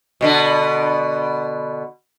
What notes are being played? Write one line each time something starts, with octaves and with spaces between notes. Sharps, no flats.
B2 D3 B3